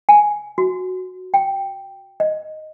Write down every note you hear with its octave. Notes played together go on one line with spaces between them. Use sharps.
G#5
F#4
G5
D#5